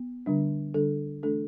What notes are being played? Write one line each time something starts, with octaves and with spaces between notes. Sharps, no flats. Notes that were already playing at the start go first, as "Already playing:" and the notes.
Already playing: B3
D3 G3 D4
D3 G3 D4 A4
E3 A3 D4 A4